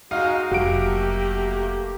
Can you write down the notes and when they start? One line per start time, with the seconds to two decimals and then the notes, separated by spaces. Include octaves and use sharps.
0.11 G#3 D#4 F#4 F5
0.51 F1 F#3 A3 A#3 G4 D7